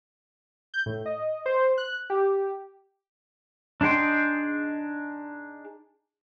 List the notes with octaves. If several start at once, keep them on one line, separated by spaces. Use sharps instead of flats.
G6
A2
D#5
C5
F#6
G4
D4 D#4 G#4 G5 C6